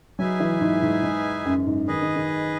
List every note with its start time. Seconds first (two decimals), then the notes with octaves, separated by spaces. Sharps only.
0.19 F#3 D#4 G#4 B4 E5 G#5
0.40 E3
0.61 G#2
0.82 G#2
1.03 G#2
1.46 F#2
1.67 G#2
1.88 D#3 G#4 B4 D#5
2.02 D#3
2.16 D#3